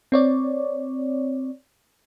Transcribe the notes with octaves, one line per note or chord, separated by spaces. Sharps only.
C4 C#5 D5